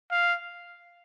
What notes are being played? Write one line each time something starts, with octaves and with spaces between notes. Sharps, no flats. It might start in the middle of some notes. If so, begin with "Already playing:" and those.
F5